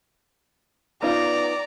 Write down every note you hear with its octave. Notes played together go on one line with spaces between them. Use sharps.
B3 D#4 F4 D5 A#5